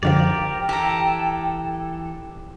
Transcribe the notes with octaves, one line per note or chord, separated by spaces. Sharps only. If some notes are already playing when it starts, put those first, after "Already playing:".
F#2 D3 F3 G4 A#4 D5 G5
E3 G4 A4 F5 A#5